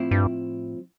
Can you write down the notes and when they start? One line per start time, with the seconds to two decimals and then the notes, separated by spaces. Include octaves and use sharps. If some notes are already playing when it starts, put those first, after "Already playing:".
Already playing: A2 F3 C4 E4
0.11 G2